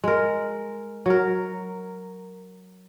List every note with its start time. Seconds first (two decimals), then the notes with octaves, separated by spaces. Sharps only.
0.04 G#3 A#4
1.06 F#3 A#4